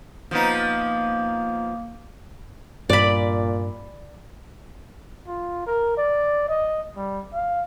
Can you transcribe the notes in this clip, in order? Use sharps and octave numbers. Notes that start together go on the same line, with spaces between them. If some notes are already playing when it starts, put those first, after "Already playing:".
F3 A#3 B3 D#4
G2 A#2 D5 B5
F4
A#4
D5
D#5
G3
F5